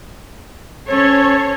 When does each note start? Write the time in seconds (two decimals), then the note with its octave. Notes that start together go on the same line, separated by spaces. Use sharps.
0.89 C#4 A4 C5 C#5